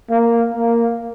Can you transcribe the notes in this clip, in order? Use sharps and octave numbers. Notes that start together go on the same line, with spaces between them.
A#3
A#3